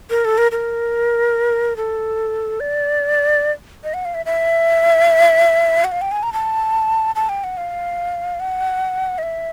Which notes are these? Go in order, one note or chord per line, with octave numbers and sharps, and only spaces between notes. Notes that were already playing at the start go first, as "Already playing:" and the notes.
A#4
A4
A#4
A#4
A4
D5
D#5
F#5
F5
E5
E5
F#5
F5
G5
G#5
A#5
A5
A5
G5
F#5
F5
F#5
D#5
E5